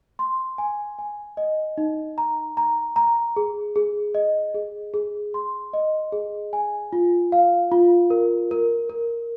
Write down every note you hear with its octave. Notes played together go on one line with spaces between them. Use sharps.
C6
G#5
G#5
D#5
D#4
A#5
A#5
A#5
G#4
G#4
D#5
G#4
G#4
C6
D#5
G#4
G#5
F4
F5
F4
A#4
A#4
A#4